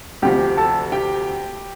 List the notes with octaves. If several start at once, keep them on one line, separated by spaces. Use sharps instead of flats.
D2 C3 F3 G4 G5
A4 A5
G4 G5